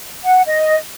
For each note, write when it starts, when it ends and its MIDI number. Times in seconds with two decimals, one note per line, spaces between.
0.24 0.41 78
0.47 0.77 75